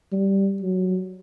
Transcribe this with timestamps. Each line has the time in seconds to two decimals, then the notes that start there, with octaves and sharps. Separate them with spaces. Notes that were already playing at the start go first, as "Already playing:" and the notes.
0.12 G3
0.62 F#3